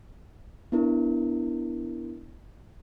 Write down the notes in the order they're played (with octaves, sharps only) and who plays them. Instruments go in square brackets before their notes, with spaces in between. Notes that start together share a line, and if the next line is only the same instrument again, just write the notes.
[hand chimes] B3 D4 E4 A#4